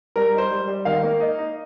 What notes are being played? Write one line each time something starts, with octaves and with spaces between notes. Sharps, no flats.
G3 A#4
D#4 C5
G3
G3
D#3 F5
A#3
D#4
D#4